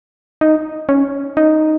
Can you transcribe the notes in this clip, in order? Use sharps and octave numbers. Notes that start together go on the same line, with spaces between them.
D#4
C#4
D#4